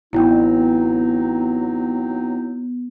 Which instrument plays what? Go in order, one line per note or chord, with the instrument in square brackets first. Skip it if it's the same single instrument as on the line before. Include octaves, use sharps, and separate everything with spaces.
[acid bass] A1 [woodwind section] F#3 C4 D#4 [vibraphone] B3 [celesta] E4 G5